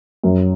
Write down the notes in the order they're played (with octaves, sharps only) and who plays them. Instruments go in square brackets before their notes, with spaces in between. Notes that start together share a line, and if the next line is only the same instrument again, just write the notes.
[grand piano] F#2